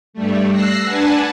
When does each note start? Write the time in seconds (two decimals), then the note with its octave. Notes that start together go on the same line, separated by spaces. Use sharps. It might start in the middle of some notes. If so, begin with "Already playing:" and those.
0.13 G2 G3 A3
0.51 E6 F#6 A#6 C7
0.85 D4 B4 F#5 G#5 A5